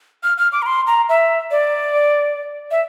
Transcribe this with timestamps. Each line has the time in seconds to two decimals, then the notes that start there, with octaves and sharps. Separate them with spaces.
0.23 F6
0.38 F6
0.52 D6
0.62 A#5
0.66 C6
0.87 A#5
1.09 E5
1.51 D5
2.71 E5